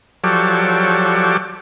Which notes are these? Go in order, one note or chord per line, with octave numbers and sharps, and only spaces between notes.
F3 F#3 G4 A4 C#5 D5